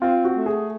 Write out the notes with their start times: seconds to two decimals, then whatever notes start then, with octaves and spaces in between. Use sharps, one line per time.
0.01 C4 F4
0.25 F#4
0.36 A3
0.46 G#4